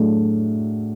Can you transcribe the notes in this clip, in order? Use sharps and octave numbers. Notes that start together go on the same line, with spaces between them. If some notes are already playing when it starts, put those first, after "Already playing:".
Already playing: A2 F#3 A3 D4 G#4